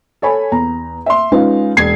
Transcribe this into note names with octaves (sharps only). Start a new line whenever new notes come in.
A4 C#5 G#5 B5
E2 A#5
E5 C6
G#3 C#4 D#4 F4 B4 F5
E1 G#6 C7